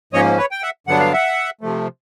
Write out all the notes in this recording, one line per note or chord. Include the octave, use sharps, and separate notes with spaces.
G#2 F3 A#3 C#4 C#5 D#5
B4 C#5
G5
E5 F#5
G2 D3 F#3 B3 D4 F#5
F5
E5 F#5
C3 F3 A3